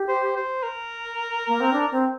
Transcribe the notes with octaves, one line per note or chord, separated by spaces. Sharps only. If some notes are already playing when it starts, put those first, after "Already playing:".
Already playing: G4
C5
C5
A#4
A#3
C4
D4
C4